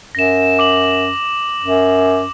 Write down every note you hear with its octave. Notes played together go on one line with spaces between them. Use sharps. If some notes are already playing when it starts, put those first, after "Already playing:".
F#2 A#6 E7
D6 E7 F#7
F#2